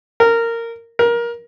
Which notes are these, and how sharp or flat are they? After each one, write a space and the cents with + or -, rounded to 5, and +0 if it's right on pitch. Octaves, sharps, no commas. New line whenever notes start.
A#4 -15
A#4 +20